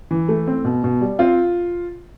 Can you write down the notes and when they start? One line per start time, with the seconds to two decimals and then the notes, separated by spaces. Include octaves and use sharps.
0.11 E3
0.28 A3
0.48 C4
0.65 B2
0.84 B2
1.01 G3
1.19 C4 F4